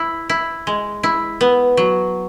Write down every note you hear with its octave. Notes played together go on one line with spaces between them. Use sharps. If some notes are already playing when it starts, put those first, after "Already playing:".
Already playing: E4
E4
G#3
E4
B3
F#3